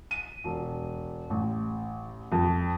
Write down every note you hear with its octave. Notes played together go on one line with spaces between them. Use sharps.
D#7
E1
A1
F2